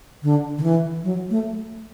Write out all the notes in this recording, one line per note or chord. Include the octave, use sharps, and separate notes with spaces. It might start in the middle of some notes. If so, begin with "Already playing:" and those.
D3
D3
E3
F#3
A3